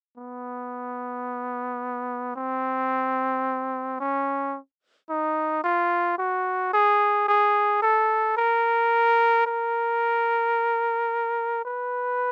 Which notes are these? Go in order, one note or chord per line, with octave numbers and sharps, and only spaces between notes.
B3
C4
C#4
D#4
F4
F#4
G#4
G#4
A4
A#4
A#4
B4